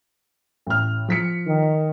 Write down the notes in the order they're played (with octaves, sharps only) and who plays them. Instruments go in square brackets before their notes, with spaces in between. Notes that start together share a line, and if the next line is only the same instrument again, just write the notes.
[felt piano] A1 F6
F3 B6 C#7
[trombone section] D#3